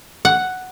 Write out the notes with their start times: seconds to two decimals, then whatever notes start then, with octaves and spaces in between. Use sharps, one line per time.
0.25 F#5